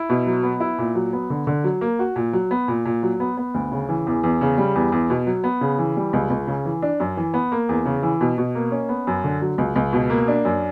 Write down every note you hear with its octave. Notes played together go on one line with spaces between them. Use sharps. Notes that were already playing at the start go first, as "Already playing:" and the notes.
Already playing: E4
B2
F#3
B3
E4
A#2
F#3
B3
D3
D3
F#3
A#3
F#4
A#2
F#3
B3
A#2
A#2
F#3
B3
B3
D2
C#3
E3
E2
E2
C#3
G3
E2
E2
B2
F#3
B3
C#3
E3
G3
C#2
C#2
C#3
E3
D4
F#2
E3
B3
A#3
E2
C#3
E3
B2
B2
A#3
C#4
B3
F#2
D3
F#3
C#2
C#2
B2
A#3
D4
F#2